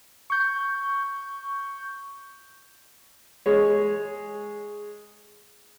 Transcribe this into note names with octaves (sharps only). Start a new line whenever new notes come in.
C#6 G6
G#3 C#5